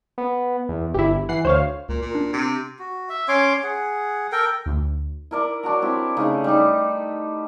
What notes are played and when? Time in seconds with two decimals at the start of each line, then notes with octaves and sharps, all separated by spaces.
0.18 B3
0.69 E2
0.94 G1 E4 G4
1.29 E3 F#5 C7
1.45 D2 C5 C#5 F5
1.89 C#2 A#2
2.02 A#2
2.15 D4
2.33 C3
2.79 F#4
3.09 E5
3.28 C#4 C#5 C6 D6
3.63 G#4 F#5
4.32 A4 A#4 G5
4.66 D2
5.31 E4 A#4 D5
5.63 F#3 D4 F#4 A#5
5.82 C4 E4 G4
6.17 C#3 A3 D#4
6.44 G3 D#4